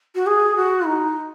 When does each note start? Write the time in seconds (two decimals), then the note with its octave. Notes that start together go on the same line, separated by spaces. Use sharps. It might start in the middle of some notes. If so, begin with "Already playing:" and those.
0.15 F#4
0.26 G#4
0.56 F#4
0.85 D#4